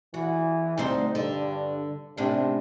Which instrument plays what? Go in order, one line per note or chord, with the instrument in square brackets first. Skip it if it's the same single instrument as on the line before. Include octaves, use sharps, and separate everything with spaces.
[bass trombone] E3 [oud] F#4
[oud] D2 G3 C4 [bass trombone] D#4
[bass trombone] G2 [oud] D3
[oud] A2 C#4 D4 [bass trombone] C3